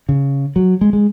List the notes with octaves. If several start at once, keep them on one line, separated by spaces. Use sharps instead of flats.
C#3
F#3
G#3
G#3